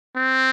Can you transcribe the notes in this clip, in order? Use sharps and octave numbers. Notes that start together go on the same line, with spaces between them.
C4